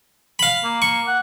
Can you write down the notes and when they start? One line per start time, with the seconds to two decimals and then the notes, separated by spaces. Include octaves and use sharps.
0.39 F5 B5
0.64 A#3
0.82 C#6
1.07 F#5